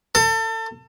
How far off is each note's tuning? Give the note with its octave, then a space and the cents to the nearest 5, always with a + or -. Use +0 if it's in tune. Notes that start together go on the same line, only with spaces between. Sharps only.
A4 +30